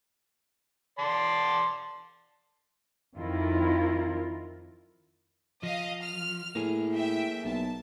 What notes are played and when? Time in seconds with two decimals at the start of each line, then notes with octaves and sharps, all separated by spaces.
0.98 D5 A5 C6
3.15 F2 D#3 E4 F4 A#4
5.63 F3 D#5 F5
6.02 F6
6.55 A2 A#3 G#4
6.93 E5 G5
7.44 B1 A5